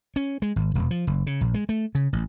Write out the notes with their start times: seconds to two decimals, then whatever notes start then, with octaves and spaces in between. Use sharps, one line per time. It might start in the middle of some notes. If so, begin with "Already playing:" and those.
0.16 C#4
0.42 G#3
0.56 G#1
0.75 E1
0.91 F3
1.07 F#1
1.27 C#3
1.41 A#1
1.54 G#3
1.69 A3
1.95 C#3
2.13 A1